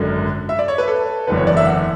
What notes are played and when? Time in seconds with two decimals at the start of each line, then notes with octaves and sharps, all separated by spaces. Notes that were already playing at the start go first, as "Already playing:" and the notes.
Already playing: G#1 F#2 D3
0.49 E5
0.59 D5
0.68 C#5
0.78 B4
0.88 A4
1.27 F#1 E2 D3 B4
1.37 C#5
1.47 D5
1.57 E5
1.67 F#5